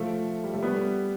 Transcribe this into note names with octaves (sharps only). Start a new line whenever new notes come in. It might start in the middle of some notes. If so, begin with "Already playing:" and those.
Already playing: F3 A3
G3
A3
G3 B3